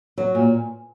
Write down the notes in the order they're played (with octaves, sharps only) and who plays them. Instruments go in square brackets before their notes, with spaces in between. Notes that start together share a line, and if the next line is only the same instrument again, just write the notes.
[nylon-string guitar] F#3
A#2